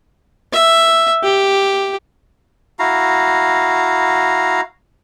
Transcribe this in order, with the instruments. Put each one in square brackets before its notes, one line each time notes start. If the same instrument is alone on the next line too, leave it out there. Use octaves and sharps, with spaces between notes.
[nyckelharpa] E5
G4
[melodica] E4 F#4 F5 A#5